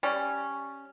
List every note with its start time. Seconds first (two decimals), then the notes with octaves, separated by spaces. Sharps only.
0.03 G3 C#4